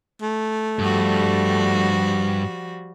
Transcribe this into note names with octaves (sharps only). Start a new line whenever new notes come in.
A3
G2 F3 G3 F#4